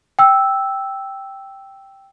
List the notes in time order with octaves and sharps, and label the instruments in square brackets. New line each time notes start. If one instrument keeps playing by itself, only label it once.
[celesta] G5 E6